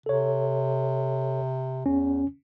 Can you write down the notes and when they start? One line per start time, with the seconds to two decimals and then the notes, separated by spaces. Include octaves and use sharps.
0.06 C3 A4 C#5
1.86 E2 C#4